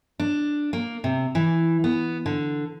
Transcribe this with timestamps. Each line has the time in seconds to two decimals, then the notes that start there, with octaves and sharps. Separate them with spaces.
0.20 D4
0.73 A#3
1.04 C3
1.35 E3
1.84 B3
2.26 D3